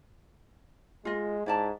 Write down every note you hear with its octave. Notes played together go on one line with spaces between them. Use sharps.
G#3 F4 D#5
G#2 E4 D5 A5